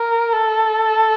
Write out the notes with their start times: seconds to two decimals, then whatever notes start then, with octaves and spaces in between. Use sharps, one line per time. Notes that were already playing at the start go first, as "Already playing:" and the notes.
Already playing: A#4
0.33 A4